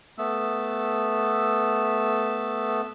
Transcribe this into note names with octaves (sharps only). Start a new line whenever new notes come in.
A3 B3 E6